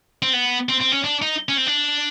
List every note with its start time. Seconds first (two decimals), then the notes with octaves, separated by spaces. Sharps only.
0.22 C4
0.33 B3
0.69 C4
0.81 C4
0.92 C#4
1.04 D4
1.22 D#4
1.49 C#4
1.57 C4
1.66 D4